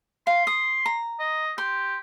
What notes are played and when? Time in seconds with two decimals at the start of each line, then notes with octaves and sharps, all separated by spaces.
0.27 F5 C6
0.47 D#6
0.86 A#5
1.19 D#5
1.58 G4 C6